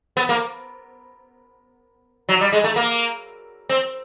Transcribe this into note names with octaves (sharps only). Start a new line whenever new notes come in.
B3
A#3
F#3
G3
G#3
A3
A#3
C4